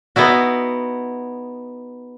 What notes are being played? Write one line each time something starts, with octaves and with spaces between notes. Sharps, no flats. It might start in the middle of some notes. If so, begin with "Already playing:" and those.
B3 D#4 E4 F#4